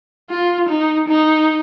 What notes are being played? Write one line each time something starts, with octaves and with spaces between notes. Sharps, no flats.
F4
D#4
D#4